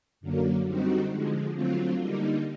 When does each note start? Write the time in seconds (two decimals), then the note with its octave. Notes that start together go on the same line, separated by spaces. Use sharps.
0.21 F#2 D3 F#3 A#3
0.66 D3 G3 C4 D#4 F#4
1.10 D3 F3 G#3
1.54 D3 F#3 A3 C4 F4
1.99 D3 G3 A#3 D#4